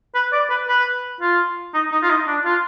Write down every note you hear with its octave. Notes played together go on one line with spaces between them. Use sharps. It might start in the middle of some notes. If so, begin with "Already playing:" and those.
B4
D5
B4
B4
F4
D#4
D#4
F4
D#4
D4
F4